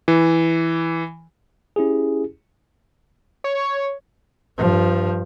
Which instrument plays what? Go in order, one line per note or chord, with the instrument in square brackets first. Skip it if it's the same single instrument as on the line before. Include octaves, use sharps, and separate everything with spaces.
[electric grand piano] E3
[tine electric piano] C#4 E4 G4 G#4
[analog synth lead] C#5
[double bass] G2 F3